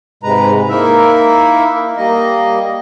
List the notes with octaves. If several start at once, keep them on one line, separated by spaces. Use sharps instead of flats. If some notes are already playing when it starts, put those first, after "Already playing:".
G#2 C3 G#3 B4 A#5
A#3 D#4 E4 A#4 E5
G3 A#3 D#5